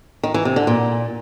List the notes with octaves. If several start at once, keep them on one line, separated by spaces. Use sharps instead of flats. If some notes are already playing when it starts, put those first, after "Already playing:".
D#3
E3
C3
D3
A#2